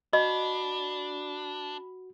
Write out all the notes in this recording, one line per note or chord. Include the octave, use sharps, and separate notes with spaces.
D4 F#4 D#5 B5